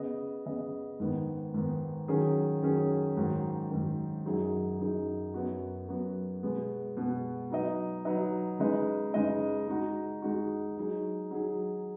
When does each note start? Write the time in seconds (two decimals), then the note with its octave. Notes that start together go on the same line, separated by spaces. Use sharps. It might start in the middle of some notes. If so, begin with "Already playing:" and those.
Already playing: C#3 B3 G#4 D#5
0.46 C#3 B3 G#4 D#5
1.00 G#2 D#3 B3
1.54 G#2 D#3 B3
2.08 D#3 F#3 C#4 G#4
2.62 D#3 F#3 C#4 G#4
3.17 G#2 D#3 F#3
3.71 G#2 D#3 F#3
4.26 F#2 F#3 D#4 G#4
4.80 F#2 F#3 D#4 G#4
5.34 F#2 F#3 B3 F#4
5.88 F#2 F#3 B3 F#4
6.43 B2 G#3 B3
6.97 B2 G#3 B3
7.51 F#3 D#4 B4 D#5
8.05 F#3 D#4 B4 D#5
8.59 C#3 G#3 D#4 B4 D#5
9.14 C#3 G#3 D#4 B4 D#5
9.68 G#3 D#4 F#4
10.22 G#3 D#4 F#4
10.77 F#3 D#4 G#4
11.31 F#3 D#4 G#4